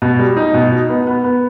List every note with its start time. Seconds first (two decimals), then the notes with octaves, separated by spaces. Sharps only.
0.02 B2
0.19 G3
0.37 D#4
0.54 B2
0.71 D#4
0.89 B3
1.07 B3
1.24 B3